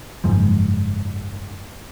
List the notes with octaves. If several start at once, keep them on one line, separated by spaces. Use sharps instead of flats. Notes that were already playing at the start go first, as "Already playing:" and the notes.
F#1 G#2 F3